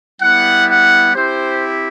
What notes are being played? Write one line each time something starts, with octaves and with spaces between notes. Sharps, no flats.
G3 B3 E4 F#5
F#5
C4 E4 G4 C5